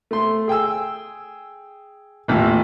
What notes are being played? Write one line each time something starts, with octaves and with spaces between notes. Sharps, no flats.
A3 C6
G#4 G5 G#5 E6
A1 D#2 D#3 F4 G#5